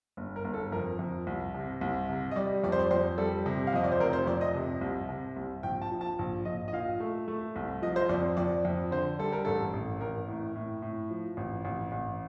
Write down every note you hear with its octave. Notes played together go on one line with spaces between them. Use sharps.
G1
A#4
G1
A4
F2 A#4
F2
C2
C3
C2
C3
D#5
G3 D5
F2 D5
C5
D5
F2 C5
G3 A4
C3
F5
F2 D#5
D5
C5
F1 A#4
C5
F2 D5
D#5
C3
C2
C3
C2
A#1 G5
A5
F3
A5
A#1
A#1 D#5
D#5
A#2 F5
A3
A3
C2
F3 D#5
C5
F2 D5
F2 D5
F2
D3 C5
G3 A4
A#4
A1 A4
A1
A1 A#4
A2
A2
A2
F3
A1
A1
A1